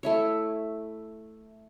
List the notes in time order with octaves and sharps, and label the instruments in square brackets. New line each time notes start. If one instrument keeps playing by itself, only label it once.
[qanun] A3 E4 C#5